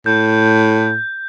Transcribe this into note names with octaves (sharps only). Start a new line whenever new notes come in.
A2 G6